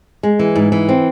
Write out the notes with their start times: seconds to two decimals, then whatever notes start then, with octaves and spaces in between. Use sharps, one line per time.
0.23 G#3
0.39 E3
0.55 G#2
0.72 E3
0.89 C4